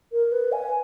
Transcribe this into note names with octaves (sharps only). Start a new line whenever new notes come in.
A#4
B4
G#5